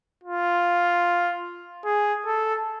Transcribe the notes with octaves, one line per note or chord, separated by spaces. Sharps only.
F4
G#4
A4